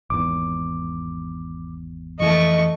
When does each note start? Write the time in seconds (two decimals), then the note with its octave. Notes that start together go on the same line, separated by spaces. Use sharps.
0.10 G#1 E2 D6
2.20 F2 E3 A3 D#5 C#6